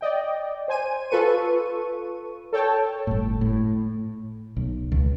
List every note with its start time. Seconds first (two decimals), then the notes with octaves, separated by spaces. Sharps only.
0.01 D5 D#5 G5
0.68 C5 G#5 D#7
1.10 F4 A4 B4 C#6 D#7
2.53 A4 C#5 G5 A5
3.07 G1 A2
3.41 A2
4.57 B1
4.92 C#2